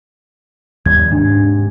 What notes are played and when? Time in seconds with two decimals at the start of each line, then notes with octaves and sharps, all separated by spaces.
0.86 D#2 G3 G#6
1.12 G#2 C3 D4